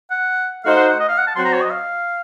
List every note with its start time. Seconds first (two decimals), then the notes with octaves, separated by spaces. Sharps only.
0.11 F#5
0.64 A3 D#4 F#4 C5 F5
0.76 F#5
0.88 F#5
1.00 D#5
1.09 F5
1.18 F#5
1.27 A5
1.36 F#3 C4 F#4 C5 C6
1.45 A#5
1.53 C#5
1.62 D#5
1.71 F5